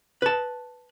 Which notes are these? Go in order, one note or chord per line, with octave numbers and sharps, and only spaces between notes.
B4 A5